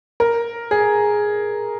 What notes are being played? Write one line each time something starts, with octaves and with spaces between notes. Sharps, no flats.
A#4
G#4